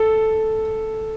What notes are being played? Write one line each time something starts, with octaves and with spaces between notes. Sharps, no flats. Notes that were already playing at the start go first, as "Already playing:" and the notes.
Already playing: A4